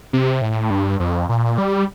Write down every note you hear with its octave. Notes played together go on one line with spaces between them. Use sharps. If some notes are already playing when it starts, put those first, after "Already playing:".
C3
A2
G2
F2
A#2
G3